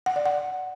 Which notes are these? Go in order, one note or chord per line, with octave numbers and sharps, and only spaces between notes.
F#5
D5
F#5